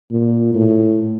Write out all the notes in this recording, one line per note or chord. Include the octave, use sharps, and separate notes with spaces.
A#2
A2